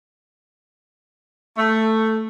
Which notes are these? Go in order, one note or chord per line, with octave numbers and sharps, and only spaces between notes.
A3